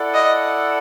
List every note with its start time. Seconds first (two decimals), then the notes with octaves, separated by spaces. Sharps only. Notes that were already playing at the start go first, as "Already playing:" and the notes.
Already playing: E4 A4 D5 F#5
0.14 D#5